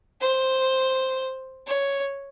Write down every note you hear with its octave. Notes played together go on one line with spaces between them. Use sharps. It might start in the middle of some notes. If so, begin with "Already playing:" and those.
C5
C#5